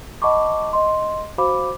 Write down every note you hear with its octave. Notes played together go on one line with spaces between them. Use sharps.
D#5 F#5 A5 B5 C#6 D6
D#5 C6
F#4 C5 F5 B5 D6